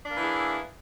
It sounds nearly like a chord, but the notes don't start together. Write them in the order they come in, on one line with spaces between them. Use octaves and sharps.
D4 A#3 E3 E4 G#4